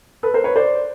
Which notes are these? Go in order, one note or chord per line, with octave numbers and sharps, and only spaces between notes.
A4 B4
A#4 C5
B4 C#5
C5 D5